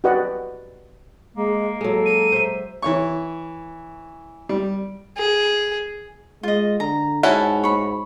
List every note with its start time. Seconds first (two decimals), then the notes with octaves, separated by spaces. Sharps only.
0.04 F#4 G4 B4 D5 D#5 F#5
1.36 G#3 A#3
1.81 F#3 G#3 A4
2.05 D#7
2.32 C5 E5
2.82 E3 C#5 C#6
4.49 G3
5.17 G#4
6.43 G#3 F4 D#5
6.80 D3 A#5
7.23 G#2 C#4 E4 F#4 A5
7.64 C#5 B5